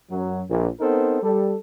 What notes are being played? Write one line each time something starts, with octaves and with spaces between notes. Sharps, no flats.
F#2 F#3
A#1 A#2
B3 C4 D#4 A4 A#4 C5
G3 A4